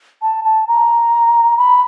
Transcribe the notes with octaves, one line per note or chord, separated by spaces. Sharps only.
A5
A5
A#5
B5